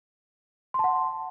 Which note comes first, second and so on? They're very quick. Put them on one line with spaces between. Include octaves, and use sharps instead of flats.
C6 A5 F#5